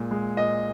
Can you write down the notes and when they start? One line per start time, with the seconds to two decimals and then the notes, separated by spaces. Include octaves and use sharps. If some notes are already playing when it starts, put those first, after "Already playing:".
Already playing: A#2 G#3
0.11 G#3
0.37 A#2 D#5